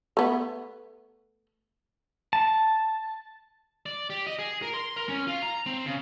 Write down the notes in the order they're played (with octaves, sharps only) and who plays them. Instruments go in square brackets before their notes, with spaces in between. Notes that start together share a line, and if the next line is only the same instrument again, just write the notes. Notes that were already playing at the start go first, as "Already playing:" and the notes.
[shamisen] A3 B3
[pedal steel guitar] A5
[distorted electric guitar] D5
G4
D#5
G#4
A#4
C6
A#4
C#4
F4
A#5
C4
C#3